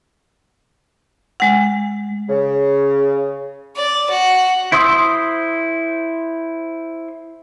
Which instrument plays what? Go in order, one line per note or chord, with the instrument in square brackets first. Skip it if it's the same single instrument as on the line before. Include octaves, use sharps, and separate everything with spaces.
[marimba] G#3 F#5
[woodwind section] C#3
[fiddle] D5
F#4
[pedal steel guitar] E4 C5 C6 D#6 E6